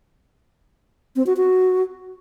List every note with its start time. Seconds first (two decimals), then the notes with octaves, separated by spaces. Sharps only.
1.16 C4
1.26 F#4
1.37 F#4